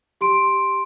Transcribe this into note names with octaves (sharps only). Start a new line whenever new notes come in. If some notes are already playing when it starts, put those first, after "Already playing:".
G4 C6 D7